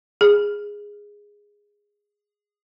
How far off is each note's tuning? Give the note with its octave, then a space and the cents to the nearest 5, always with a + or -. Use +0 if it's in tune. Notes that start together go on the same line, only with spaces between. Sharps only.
G#4 -10